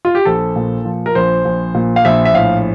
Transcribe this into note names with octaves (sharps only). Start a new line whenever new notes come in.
F4
G4
A#1 A4
A#2
F3
A#4
A#1 C5
A#1
A#2
F5
A#1 E5
E5
A2 F5